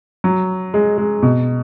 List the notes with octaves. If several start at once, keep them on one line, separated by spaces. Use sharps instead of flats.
F#3
G#3
G#3
B2